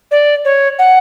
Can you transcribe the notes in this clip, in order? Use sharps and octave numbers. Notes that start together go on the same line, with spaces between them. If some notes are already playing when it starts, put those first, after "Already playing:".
D5
C#5
F#5